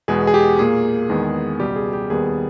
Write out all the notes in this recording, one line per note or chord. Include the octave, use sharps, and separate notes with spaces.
E2 B2 G#3 B3 G#4
G#4
G4
A#2 A#3 G#4
E2 D#3 G#3 B3
C#2 B2 G3 G4
G#4
G4
D#2 D#3 G3 B3 G#4